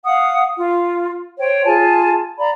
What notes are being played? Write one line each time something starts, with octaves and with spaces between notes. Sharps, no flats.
F5 F#5 D#6
F4
C5 C#5 G5
F4 G#4 G#5 A5
D5 F5 A#5 B5